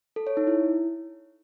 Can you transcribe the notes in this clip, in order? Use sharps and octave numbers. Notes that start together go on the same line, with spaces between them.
A4
C#5
D#4
E4